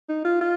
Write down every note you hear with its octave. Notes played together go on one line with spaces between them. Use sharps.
D#4
F4
F4